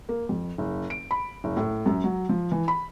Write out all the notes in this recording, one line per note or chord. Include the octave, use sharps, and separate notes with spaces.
A#3
F2
F#1
D7
B5
F#1
A2
F#2
F#3
F3
E3
B5